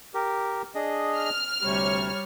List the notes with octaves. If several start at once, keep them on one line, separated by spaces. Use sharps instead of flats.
G4 A#4
D4 G#4 D#5
F6
D2 C3 G3 C#5